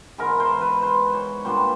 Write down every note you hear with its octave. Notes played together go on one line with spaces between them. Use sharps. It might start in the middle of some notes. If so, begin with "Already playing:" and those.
G#2 E3 G#3 B3 A#4
C5
B4
C5
C#5
A#2 G3 B3 D4 C5